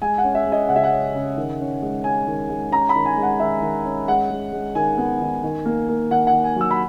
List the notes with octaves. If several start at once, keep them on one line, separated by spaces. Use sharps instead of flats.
G#3 G#5
F#5
C#4
E5
G#3
D#5
C#3 F#5
E5
F#5
C#4
C#3
D#3
C#4
G#3
C#4 G#5
D#3
G#3
C#4 A#5
B5
D#3
G#5
G#3
F#5
D#3 E5
D#3
C#4
G#3 F#5
G#3
G#3
D#3 G#5
B3
D#3
D#3
A#3
A#3
D#3 F#5
F#5
D#3
G#5
F#3 E6
B5